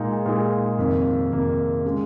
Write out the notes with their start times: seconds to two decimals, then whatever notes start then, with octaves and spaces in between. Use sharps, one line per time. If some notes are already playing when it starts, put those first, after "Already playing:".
Already playing: A#2 G#3 D#4 G#4
0.26 A#2 G#3 D#4 G#4
0.79 F2 C3 D#3 A#3
1.31 F2 C3 D#3 A#3
1.85 C#3 G#3